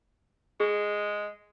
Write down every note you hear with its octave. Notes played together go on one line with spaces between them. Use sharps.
G#3 G#4